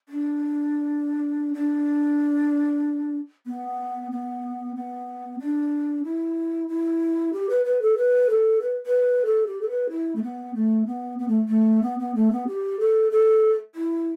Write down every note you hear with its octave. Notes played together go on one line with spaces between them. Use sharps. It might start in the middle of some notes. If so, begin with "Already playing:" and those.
D4
D4
B3
B3
B3
D4
E4
E4
G4
B4
B4
A4
B4
A4
B4
B4
A4
G4
A4
B4
E4
A3
B3
A3
B3
B3
A3
A3
B3
B3
A3
B3
G4
A4
A4
E4